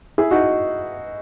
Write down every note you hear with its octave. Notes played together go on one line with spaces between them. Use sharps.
E4 G#4
D#4 F#4